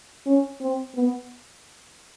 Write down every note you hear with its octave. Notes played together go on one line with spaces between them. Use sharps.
C#4
C4
B3